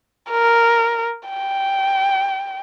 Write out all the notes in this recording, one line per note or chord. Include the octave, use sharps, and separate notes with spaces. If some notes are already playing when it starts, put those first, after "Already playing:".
A#4
G5